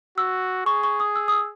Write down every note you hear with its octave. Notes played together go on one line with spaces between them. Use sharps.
F#4 E6
G#4 C#6
C#6
D#6
E6
D#6
E6